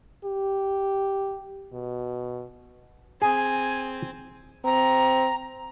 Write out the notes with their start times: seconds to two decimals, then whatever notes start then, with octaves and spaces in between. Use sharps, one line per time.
0.24 G4
1.73 B2
3.22 C4 G#4 G#5
4.65 C4 A#5